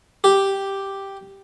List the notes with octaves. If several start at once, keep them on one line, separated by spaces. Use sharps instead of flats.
G4